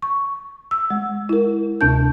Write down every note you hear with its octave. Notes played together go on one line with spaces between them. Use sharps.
C#6
E6
G#3
E4 A#4
D2 C3 D4 A5 G6